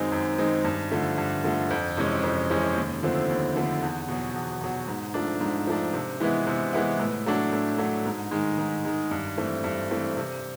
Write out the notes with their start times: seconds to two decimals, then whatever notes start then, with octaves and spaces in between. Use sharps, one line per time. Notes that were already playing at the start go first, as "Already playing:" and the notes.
Already playing: F#2 D#3 G#3 C4 D#4
0.12 F#2
0.38 D#3 G#3 C4 D#4
0.64 G2
0.91 D3 F3 A3
1.18 G2
1.44 D3 F3 A3
1.70 F2
1.97 C3 E3 G#3 C#4
2.23 F2
2.50 C3 E3 G#3 C#4
2.76 D#2
3.03 D3 F3 A3 C4
3.29 D#2
3.56 D3 F3 A3 C4
3.82 E2
4.09 B2 F#3
4.35 E2
4.61 B2 F#3
4.88 G#2
5.14 F3 A3 D4
5.41 G#2
5.67 F3 A3 D4
5.94 C3
6.20 E3 G#3 B3 E4
6.47 C3
6.73 E3 G#3 B3 E4
7.00 A2
7.26 F#3 A3 D4
7.53 A2
7.78 F#3 A3 D4
8.06 G#2
8.31 D#3 G#3
8.58 G#2
8.85 D#3 G#3
9.11 G2
9.38 E3 A3 C4
9.64 G2
9.91 E3 A3 C4
10.17 C3